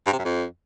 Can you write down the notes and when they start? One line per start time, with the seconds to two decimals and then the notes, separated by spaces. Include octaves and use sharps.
0.06 G2
0.13 C3
0.19 F#2
0.25 F2